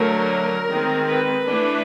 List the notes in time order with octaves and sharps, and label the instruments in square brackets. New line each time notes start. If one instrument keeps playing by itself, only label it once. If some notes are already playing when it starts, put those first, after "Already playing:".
Already playing: [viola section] D3 F#3 A3 A#4
D#3 G#3 C4
B4
E3 A3 D4